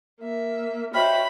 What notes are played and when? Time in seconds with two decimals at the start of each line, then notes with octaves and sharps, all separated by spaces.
0.20 A#3 E5
0.94 F#4 C5 C#5 D#5 E5 G5 B5 F6